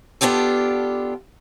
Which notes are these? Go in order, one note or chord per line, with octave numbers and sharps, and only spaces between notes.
B3 D4 F4 G4 A4